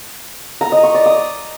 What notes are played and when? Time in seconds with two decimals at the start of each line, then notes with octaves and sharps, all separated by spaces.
0.61 A#5
0.72 D#5
0.83 C#6
0.95 D5
1.06 D#6